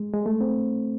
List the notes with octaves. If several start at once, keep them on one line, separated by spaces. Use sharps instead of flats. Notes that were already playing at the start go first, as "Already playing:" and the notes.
Already playing: G#3
G#3
A3
C4